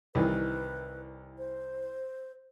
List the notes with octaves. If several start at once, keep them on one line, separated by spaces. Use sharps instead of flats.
C2 D#3 E3 B4
C5